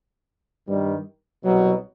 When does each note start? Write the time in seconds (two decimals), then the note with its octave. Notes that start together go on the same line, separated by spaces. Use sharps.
0.65 G2 D#3 G3
1.44 C2 B2 F#3